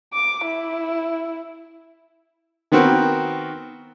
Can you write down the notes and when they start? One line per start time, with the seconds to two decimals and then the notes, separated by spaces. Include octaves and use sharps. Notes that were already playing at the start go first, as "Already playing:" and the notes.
0.14 D6
0.46 E4
2.72 D#3 B3 C4 F#4 A#4